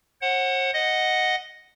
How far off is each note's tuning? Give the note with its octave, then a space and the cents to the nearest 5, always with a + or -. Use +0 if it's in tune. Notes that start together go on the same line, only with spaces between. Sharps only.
C5 +45 F#5 +0
D#5 +0 F#5 -5